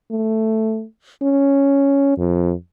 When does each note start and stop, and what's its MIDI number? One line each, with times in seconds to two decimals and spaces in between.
0.11 0.84 57
1.23 2.18 61
2.18 2.53 41